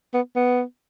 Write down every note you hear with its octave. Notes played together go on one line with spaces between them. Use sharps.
B3
B3